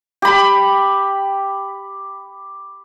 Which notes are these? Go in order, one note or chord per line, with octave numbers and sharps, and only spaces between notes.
G4 B5